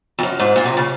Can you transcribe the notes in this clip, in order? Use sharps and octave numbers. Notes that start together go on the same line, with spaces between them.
F2
F#2
G#2
A#2
C3
C#3